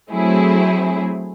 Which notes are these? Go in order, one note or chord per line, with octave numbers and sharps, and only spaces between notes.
F#3 A3 C4 E4 G#4